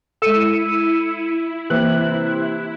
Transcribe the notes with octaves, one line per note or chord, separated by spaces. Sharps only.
G#3 E4 A4 E6 C#7 D#7
C3 E3 A#3 F#6